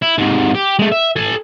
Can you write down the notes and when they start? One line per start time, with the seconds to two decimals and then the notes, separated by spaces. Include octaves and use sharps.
0.02 E4
0.18 G#2 C3
0.55 G4
0.79 G#3 A3
0.92 E5
1.16 A4 G#5